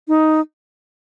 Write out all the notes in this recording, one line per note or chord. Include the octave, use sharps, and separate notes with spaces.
D#4